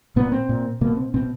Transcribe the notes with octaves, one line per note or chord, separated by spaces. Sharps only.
A#2 B3
C4
A#2
B2 A#3
C4
B2 C4